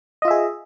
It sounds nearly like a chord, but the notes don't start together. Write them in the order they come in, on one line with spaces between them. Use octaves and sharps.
D#5 F4 E5 G#4